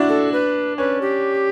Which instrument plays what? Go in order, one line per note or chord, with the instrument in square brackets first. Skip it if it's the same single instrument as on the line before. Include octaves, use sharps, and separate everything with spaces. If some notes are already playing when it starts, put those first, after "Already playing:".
Already playing: [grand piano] D4 E4 F#4
[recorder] A4
B4
[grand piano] C#4 [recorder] B4
[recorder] G4